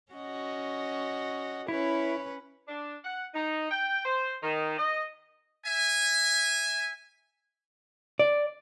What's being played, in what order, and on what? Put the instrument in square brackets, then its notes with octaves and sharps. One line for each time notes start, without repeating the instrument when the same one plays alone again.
[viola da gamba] C#4 F#4 D#5
[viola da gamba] C#4 B4 C#5 [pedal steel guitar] E4
[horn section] D4
F#5
D#4
G5
C5
D#3
D#5
[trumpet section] E5 G#5
[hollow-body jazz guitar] D5